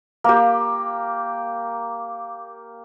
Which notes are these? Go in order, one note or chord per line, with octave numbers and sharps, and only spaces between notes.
A#3 G4